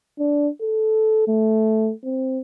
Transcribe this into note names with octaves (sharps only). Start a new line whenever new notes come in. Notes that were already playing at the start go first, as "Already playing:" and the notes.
D4
A4
A3
C4